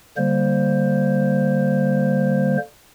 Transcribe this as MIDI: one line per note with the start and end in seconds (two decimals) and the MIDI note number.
0.17 2.57 50
0.17 2.57 55
0.17 2.57 58
0.17 2.57 72